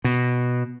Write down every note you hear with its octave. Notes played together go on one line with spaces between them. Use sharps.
B2